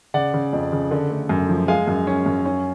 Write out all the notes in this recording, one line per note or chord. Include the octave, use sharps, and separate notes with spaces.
C#3 D5 F#5
C#3
F2
C#3
D3
A3
F#2
F3
G#3 F5 G#5
F#2
C#4
F#2
C#4